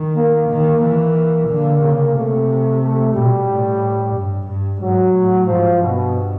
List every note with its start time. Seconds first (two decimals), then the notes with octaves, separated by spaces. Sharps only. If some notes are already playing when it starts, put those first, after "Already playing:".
Already playing: D#3
0.15 A#3
0.48 D#3
0.82 E3 A#3
1.48 D3
1.81 C#3
2.15 C3 A3
2.81 A3
3.14 B2 G3
3.48 A2
4.14 G2
4.47 G2
4.81 G#2 F#3
5.14 A2
5.47 G#2 F3
5.81 G2 B2